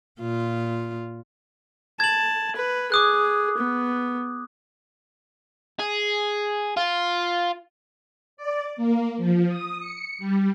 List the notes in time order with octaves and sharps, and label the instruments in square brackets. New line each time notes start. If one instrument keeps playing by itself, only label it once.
[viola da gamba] A#2 F4
[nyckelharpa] A5 [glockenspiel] G#6 F#7
[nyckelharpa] B4
[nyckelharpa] G#4 [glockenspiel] D6 D#6 F#6
[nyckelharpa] B3
[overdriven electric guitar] G#4
F4
[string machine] D5
A#3
F3
D#6
C#7
G3